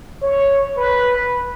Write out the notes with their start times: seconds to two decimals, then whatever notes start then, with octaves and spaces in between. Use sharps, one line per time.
0.22 C#5
0.77 B4